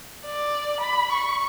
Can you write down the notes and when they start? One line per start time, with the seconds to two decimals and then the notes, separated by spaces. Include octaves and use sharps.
0.25 D5
0.80 B5
1.12 C#6